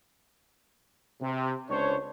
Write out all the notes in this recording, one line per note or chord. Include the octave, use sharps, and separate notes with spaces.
C3
C#2 D4 C5 C#5